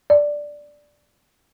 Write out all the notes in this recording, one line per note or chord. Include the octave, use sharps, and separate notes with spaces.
D5